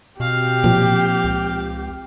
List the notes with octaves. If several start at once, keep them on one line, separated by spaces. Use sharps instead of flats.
B2 C4 G4 F5
A#2 F3
C#2